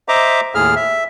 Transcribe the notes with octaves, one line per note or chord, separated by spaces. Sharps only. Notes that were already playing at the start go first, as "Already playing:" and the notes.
C5 D#5 E5 A#5 D6
D#2 A2 G#4 F6
E5